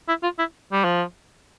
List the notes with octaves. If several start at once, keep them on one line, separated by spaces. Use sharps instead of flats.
E4
F4
E4
G3
F3